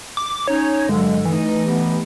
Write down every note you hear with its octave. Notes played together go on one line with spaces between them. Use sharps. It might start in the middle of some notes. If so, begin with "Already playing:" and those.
D6
C#4 D#4 C#5
G2 D3 F#3 G#3
E3 A3 D#4
B3 G4